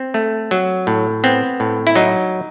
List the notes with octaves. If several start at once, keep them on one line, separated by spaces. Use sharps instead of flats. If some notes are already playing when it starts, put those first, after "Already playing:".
Already playing: C4
A3
F#3
A2
B3 C4
A2
E4
F#3 D#4